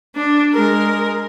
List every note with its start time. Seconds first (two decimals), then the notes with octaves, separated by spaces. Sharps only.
0.16 D4
0.54 G#3 A#4